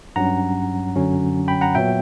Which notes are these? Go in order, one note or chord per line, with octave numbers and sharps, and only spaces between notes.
G2 F#3 C#4 F#5 A#5
F#2 D3 F#3 C#4
G5 B5
F#5 A#5
A#2 F#3 B3 E5 G5